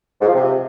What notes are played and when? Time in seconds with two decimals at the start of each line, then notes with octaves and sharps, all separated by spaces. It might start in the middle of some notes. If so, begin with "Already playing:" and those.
0.21 G#2
0.27 F3
0.34 C3